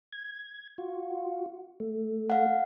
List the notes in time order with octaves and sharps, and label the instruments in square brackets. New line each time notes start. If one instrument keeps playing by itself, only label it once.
[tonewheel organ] G#6
F4 F#4
A3
[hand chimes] F5 F#5